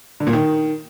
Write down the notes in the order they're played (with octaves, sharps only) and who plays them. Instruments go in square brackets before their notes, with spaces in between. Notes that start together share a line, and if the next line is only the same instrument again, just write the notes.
[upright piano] D3
A#2
D#3